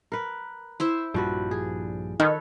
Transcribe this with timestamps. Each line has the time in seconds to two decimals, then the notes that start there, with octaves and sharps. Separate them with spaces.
0.12 A#4 B4
0.80 E4 C5 E5
1.14 A#1 G2 F3 G3 F#4 B4
1.51 G#4
2.20 D#3 A4 B4 C#5